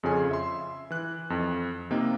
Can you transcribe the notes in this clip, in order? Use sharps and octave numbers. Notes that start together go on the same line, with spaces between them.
F2 C#3 F4 G#4 G#5
E5 C6
E3 F#6
F2
C3 A#3 D#4